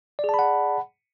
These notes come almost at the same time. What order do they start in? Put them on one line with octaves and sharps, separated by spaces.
D5 G#4 A5 B5 F#5